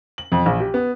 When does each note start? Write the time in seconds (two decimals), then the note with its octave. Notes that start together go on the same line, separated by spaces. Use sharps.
0.18 F#7
0.32 F2
0.46 A#1
0.60 G4
0.74 B3